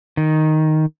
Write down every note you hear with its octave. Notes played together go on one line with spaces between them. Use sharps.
D#3